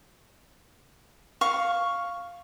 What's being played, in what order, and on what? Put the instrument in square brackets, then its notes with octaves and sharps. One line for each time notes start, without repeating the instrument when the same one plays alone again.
[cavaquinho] F5 C#6